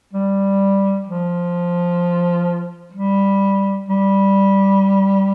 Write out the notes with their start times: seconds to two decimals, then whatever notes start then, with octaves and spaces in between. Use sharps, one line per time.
0.13 G3
1.06 F3
2.93 G3
3.88 G3